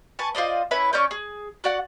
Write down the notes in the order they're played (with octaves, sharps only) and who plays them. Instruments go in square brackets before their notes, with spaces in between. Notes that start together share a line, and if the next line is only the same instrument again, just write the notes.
[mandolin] B4 G#5 A5 C#6
F4 C5 D5 D#5
C#4 E4 B4
C#4 D5 C#6 G6
G#4
F#4 D5 F#5